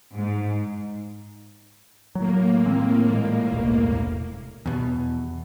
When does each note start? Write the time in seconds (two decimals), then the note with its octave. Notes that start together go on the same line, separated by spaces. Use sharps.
0.16 G#2
2.15 A2 F#3 A#3
2.66 E3 G#3 C4
3.13 A#2 G#3
3.51 E1 C2
4.66 E2 B2